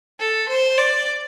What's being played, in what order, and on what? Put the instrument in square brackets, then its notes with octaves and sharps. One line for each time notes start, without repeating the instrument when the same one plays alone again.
[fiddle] A4
C5
D5